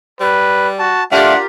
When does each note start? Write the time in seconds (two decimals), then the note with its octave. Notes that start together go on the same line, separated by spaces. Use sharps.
0.21 G3 B4
0.79 F#4 A5
1.12 A3 D4 F4 G4 A#4 F5 F#5